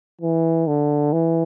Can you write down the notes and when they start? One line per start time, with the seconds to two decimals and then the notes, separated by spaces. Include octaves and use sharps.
0.21 E3
0.67 D3
1.13 E3